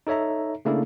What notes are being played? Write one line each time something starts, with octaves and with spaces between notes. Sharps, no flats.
D#4 A4 C#5 E5 A#5
C#3 A3 A#3 D4 E4 A4